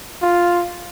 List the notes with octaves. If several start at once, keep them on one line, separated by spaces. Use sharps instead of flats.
F4